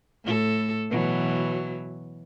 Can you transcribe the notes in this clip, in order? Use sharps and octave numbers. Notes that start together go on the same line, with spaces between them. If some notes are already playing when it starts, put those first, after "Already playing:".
A2 A4
B2 E3 F#3